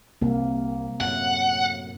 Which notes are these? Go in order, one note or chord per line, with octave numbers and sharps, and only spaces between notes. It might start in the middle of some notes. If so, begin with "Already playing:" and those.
C2 C3 A#3
F#2 A2 F#5